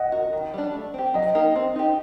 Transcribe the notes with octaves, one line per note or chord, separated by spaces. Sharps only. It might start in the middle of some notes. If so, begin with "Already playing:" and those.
Already playing: D#5 F#5
F#4 A#4
D#3
G3 D4
A3
C4 G4
F#3 D#5
A#3 D#4 G4 A#4
C4
D#4 G4